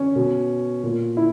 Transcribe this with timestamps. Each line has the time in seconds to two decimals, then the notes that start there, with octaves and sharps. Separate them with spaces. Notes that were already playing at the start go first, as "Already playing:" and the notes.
Already playing: C#4
0.16 B2
0.83 A#2
1.17 E4